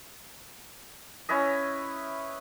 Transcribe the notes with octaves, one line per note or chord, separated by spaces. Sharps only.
C#4 E4 B4 D#5